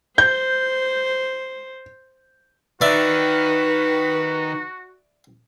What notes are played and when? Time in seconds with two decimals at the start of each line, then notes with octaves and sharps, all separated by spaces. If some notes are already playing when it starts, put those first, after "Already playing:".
0.18 C5 G6
2.81 D#3 F#4 B4 D5 E5